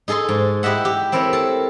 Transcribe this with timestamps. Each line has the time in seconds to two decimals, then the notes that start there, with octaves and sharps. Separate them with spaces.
0.08 D#4 G#4 A4 D#5 C6
0.29 G#2
0.63 E4 G4 D#5 E5 F#5
0.85 G4
1.12 C4 E4 A4 A#4 C#5
1.33 A4 A#4